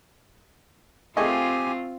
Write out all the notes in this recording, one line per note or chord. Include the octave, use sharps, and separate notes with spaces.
A3 C4 F4 G4 G#4 D#5 G#5